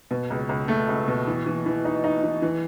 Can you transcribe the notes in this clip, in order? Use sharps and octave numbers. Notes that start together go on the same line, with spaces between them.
B2
C#2
C#2
A3
C#2
B2
E3
E3
E3
D#4
D#4
E3
E3